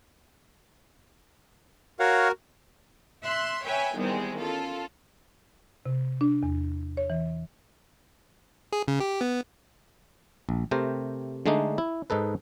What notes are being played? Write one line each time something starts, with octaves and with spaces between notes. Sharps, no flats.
F#4 A#4 C#5 F5 F#5
E5 C6 F#6
B4 C#5 E5 G5 G#5
E2 D#3 G3 G#3 C4
C#4 F4 A4
C3
D4
E2
C#5
E3
G#4
C#3
G4
B3
A#1
C3 A3 G4 A#4 C5
D3 G#3 A3 D4 D#4
E4
G#2 D#4 A4 B4